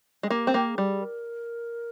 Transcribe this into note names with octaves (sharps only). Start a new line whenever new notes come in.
G#3
A#3 G4
C4
A#3
G#4
G3
A#4